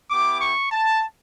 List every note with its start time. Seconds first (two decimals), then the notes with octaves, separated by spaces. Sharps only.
0.11 B3 E4 G4 D6
0.42 C#6
0.72 A5